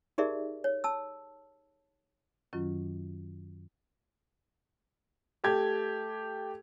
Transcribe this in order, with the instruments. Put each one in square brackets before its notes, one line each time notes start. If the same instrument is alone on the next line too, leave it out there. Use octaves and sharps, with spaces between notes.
[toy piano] D#4 G4 G#4 A#4 D5 E5
C#5
A5 E6
[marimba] F#2 D#3 F#3 C#4 F4
[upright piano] A3 G4 G#6